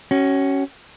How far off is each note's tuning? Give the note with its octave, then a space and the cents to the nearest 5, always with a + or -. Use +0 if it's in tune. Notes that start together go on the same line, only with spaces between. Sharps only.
C#4 +0 F#4 +40